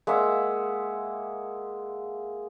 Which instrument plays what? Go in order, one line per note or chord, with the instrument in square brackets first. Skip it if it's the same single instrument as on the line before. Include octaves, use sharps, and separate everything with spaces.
[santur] G#3 A#3 E5 F#5